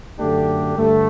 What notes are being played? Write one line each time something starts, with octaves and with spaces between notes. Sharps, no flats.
F#2 D3 A3 D4 G4
G2 D3 A3